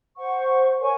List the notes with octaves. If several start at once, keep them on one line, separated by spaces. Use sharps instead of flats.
C5 F#5 C#6
A#4 C#5 G#5 C#6